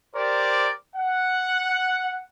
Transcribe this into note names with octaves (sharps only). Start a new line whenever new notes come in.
G4 A#4 C5 D5
F#5